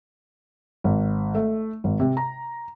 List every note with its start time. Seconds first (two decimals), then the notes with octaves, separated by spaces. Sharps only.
0.84 G#1
1.35 A3
1.84 G#1
2.00 C3
2.17 A#5